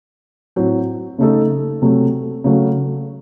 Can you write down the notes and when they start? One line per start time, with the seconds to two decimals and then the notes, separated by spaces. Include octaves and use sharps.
0.56 A2 F#3 C4
1.18 C#3 A3 D#4 A4
1.82 C3 F#3 A3 C4
2.44 C#3 F#3 A3